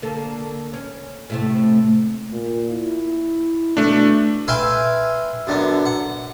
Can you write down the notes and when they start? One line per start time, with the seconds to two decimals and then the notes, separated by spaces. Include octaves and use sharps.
0.02 D3 A#3 A4
0.73 C#4
1.30 A2 C3 A3
2.32 A#2
2.71 E4
3.77 B2 A3 D4
4.48 B4 E5 F5 G5 G#5 C6
5.47 F#2 D3 B3
5.86 F#5